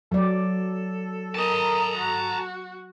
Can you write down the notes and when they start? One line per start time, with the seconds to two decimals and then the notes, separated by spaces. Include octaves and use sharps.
0.12 F#3 A4 D5
1.35 A#4 D#5 A5 A#5
1.97 F#4